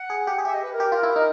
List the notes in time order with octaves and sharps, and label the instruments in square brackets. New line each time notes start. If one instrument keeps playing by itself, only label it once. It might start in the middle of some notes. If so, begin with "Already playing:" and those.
Already playing: [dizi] F#5
[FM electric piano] G#4
G4
G#4
[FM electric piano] G4 [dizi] E5
[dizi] D#5
B4
A#4
[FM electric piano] G4
F4
E4
D#4